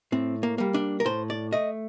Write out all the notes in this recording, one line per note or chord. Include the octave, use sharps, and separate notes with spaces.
A2 C4
A#3
G3 A#3
D4
A#4
A2 C5
D5
A3 D#5